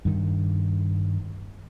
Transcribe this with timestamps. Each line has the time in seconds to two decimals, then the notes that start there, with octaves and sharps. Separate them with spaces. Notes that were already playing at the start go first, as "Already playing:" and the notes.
0.05 G2 D#3